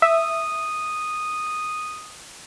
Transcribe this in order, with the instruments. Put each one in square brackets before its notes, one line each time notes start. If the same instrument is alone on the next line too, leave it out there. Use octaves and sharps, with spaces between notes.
[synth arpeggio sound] E5 [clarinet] D#6